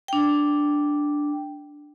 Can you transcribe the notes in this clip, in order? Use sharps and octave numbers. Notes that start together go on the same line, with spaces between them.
D4 G5